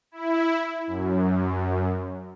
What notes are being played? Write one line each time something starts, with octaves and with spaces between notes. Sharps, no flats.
E4
F#2